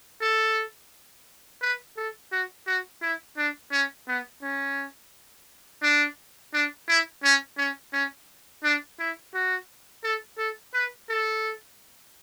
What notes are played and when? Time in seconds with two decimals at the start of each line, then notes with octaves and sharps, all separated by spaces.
0.21 A4
1.62 B4
1.97 A4
2.32 F#4
2.67 F#4
3.02 E4
3.37 D4
3.72 C#4
4.08 B3
4.42 C#4
5.83 D4
6.53 D4
6.88 E4
7.24 C#4
7.58 C#4
7.93 C#4
8.64 D4
8.99 E4
9.34 F#4
10.04 A4
10.38 A4
10.74 B4
11.09 A4